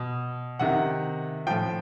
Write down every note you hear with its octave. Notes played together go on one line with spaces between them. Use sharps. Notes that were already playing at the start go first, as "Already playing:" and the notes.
Already playing: B2
C3 D#3 F#5
A2 F3 G5